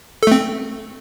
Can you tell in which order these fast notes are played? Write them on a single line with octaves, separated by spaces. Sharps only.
A4 A3 C4